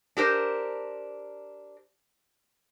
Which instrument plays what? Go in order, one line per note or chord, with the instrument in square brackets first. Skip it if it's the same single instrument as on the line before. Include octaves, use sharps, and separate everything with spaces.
[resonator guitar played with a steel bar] D4 G4 A#4 C5